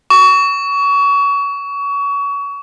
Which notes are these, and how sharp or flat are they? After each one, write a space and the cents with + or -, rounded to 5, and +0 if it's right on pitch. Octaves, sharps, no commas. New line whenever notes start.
C#6 +30